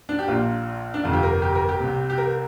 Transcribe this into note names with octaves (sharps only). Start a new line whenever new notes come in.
D4
G4
A#1 A#2 F4
D4
G1 F2 C3 F4
G4
A#4
G4
A#4
G4
C2 C3
G4
A#4